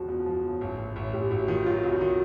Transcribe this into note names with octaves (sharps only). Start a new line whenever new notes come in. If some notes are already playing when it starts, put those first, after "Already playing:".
Already playing: E1 C#3 F3 F#4
E2
F3
C#3
A1
A1
A1
A1 G4
A1 F#4
D#3 F4
F#3 F4
C2
F#4
D#3